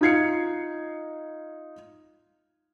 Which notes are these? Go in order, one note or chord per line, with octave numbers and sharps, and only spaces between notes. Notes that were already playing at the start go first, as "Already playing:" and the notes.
D#4 F4 G#6 C7 C#7